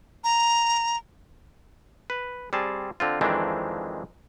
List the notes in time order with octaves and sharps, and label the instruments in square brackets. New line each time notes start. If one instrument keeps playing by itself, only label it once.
[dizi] A#5
[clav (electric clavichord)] B4
G3 C4 G#4 A5
D3 C4 F4
F2 D#3 E3 G#3 C4 D4